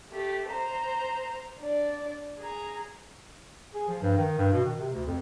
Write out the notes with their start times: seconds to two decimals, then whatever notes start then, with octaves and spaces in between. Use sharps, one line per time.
0.12 A3 G4
0.47 C5 A#5
1.59 D4 D5
2.39 G#4 A#5
3.74 G#4
3.88 F3
4.02 G2
4.17 D#3
4.38 G2
4.52 B2
4.65 D#3
4.79 C3
4.92 D2
5.06 F2